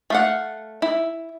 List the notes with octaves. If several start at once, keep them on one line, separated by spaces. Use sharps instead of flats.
A3 F5 F#5
E4